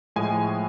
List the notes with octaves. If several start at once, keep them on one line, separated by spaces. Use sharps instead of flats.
A2 F3 G#3 G#5